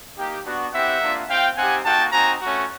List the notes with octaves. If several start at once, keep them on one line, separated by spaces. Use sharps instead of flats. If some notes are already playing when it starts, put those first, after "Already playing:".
A#3 D#4 G4
B3 D4 F#4
C4 E4 G4 E5 F#5
A#3 D4 F4
C4 F4 F5 G5
C4 D#4 G4 F#5 G#5
A#3 D#4 F#4 G5 A5
C4 D#4 F#4 G#5 A#5
A3 C#4 F#4